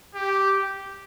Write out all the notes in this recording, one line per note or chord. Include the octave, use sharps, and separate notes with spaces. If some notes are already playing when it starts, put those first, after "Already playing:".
G4